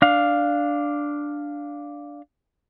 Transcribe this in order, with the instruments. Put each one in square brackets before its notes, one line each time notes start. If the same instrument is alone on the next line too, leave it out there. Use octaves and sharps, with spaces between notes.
[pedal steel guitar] D4 F5